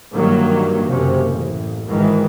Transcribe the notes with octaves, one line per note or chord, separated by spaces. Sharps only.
G2 D#3 E3 F#3 A#3
F#1 C3 C#4
A1
G#1 G#2 D#3 E3